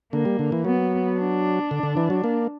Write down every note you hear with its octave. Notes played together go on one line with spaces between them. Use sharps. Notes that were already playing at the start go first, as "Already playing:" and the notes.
D3 A#3
G3
D3
E3
F#3 B3
D4
D3
D3
E3
F#3
A#3